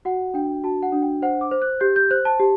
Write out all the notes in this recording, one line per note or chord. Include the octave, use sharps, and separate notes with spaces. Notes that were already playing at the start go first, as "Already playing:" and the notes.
F#4 F#5
D4 G5
F#4 A5
F#5
D4
G5
C5 F#5
D6
C5
F#6
G4 G6
G6
C5 F#6
A5
G4